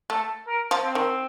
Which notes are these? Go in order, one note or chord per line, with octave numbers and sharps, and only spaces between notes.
A3 A4
A#4
F3
C4
D#3